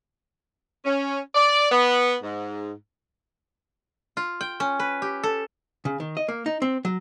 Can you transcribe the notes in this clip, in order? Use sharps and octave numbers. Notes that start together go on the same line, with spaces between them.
C#4
D5
B3
G#2
F4
G5
C#4
B4
G4
A4
C#3
D#3
D#5
A#3
D#4
C4
F#3